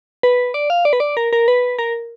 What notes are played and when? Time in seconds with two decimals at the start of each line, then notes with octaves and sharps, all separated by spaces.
0.23 B4
0.54 D5
0.70 F5
0.85 D5
0.93 B4
1.00 D5
1.17 A#4
1.33 A#4
1.48 B4
1.79 A#4